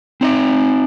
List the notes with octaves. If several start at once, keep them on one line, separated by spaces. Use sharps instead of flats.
C4 D#4 D#5 G5